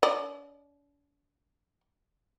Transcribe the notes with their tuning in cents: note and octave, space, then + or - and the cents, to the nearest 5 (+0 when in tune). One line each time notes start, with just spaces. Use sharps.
D4 -45 D5 +40